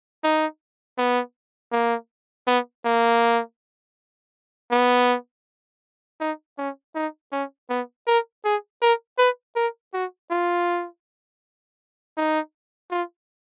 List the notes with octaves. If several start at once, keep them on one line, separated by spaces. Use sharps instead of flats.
D#4
B3
A#3
B3
A#3
B3
D#4
C#4
D#4
C#4
B3
A#4
G#4
A#4
B4
A#4
F#4
F4
D#4
F4